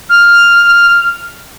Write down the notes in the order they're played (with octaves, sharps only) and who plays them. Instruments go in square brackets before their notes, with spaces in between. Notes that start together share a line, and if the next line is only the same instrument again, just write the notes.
[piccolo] F6